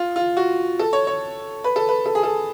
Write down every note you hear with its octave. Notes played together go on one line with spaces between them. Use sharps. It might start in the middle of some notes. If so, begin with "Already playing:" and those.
Already playing: F4
F4
F#4
A4
C#5
C#5
B4
A4
B4
A4
G#4
A4